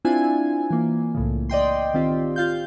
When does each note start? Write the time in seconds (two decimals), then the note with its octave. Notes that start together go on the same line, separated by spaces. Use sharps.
0.05 C4 D4 E4 F4 G#5
0.70 E3 A#3
1.15 C2 A2 C#3
1.50 D5 D#5 G5 C6
1.94 D#3 C4 F4 G4
2.36 F4 F5 G6